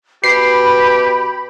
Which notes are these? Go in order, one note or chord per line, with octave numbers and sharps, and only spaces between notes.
B2 G4 B5 C7